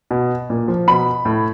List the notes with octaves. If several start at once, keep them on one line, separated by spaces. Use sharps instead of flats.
B2
A#2
F3
B2 B5
A2